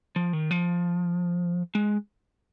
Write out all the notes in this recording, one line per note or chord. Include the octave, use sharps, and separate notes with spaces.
F3
D#3
F3
G#3